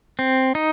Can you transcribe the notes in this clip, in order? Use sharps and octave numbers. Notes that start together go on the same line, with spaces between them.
C4
D#4